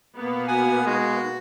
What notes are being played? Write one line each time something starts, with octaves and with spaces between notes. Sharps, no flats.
B2 A#3 B3
F#4 F#5 G#5
G#3 D#4 F#4